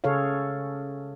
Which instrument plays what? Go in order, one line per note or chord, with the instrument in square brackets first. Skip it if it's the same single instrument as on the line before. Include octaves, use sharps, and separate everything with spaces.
[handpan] C#3 G#4 A4 C#5 F5